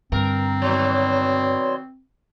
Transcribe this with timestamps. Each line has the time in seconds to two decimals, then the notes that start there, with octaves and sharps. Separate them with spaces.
0.12 G2 D3 C4 A#4
0.62 B2 D#3 F#3 C#5 D5 C6